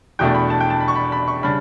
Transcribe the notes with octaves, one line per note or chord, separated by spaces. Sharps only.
E2 B2 A3 D4 G5
B5
A5
G5
A5
B5
C#6
B5
B5
C#6
C#3 G3 D4 B5